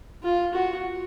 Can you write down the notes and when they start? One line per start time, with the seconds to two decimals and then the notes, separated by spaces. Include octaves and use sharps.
0.23 F4
0.53 F#4